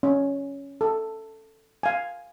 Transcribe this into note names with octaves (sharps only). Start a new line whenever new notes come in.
C#4
A4
F5 G#5